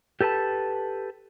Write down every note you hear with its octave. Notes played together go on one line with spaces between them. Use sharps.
G4 A4 B4 G#5 A5